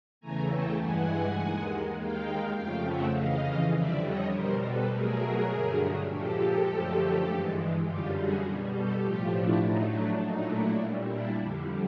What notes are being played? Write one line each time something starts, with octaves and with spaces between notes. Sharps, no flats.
E2 C#3 E3 A3 G#5 A#5
G5 A5
G2 E3 G#3 F#5 G#5
D#2 D#3 G#3
D#2 D#3 G#3 F5 G5
F2 C#3 F3 A3 F5 G5
E5 F#5
F2 C#3 E3 D#5 F5
F2 D3 G3 D5 E5
C#5 D#5
B2 G3 A#4 C5
A4 B4
B2 F#3 A3 G#4 A#4
G2 D3 F#3 A3
A#2 F3 G#3 G4 A4
F#2 D3 F3 A3
G2 E3 G#3
F#2 D3 G3 F4 G4
F#4 G#4
B2 G3
G4 A4
A2 F3 A3 F4 G4
D4 E4
A2 F#3 A3 D#4
D4
A#2 F#3 A3 D#4
D4 E4
A#2 G3
D4 E4
F2 D3 G3